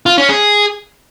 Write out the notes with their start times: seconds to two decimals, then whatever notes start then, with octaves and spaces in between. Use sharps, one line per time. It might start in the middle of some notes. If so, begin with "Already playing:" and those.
0.06 F4
0.18 C#4
0.29 G#4